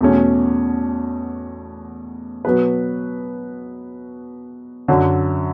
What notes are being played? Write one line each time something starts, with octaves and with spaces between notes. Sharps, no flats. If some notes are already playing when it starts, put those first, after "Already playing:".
E2 B2 A3 C#4
B2 F#3 B3 F#4 B4
F#2 D3 F#3